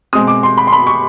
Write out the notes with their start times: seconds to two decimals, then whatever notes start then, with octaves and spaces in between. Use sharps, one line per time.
0.13 B2 G#3 C4 D#6
0.27 D6
0.43 C6
0.57 B5
0.67 C6
0.72 B5
0.87 C#6